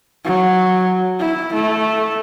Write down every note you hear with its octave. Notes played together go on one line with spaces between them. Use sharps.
F#3
E4
A3